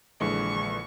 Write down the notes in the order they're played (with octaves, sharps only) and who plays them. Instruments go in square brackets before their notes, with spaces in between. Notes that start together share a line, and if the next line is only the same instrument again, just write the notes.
[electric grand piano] A#1 D3 E3 [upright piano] G#3 [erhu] C#6